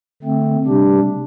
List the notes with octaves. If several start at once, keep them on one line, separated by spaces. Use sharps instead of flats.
D3 A3 C4
C3 G3 D4 G4